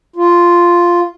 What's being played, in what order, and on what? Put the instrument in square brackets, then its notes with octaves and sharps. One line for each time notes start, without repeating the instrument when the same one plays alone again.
[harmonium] F4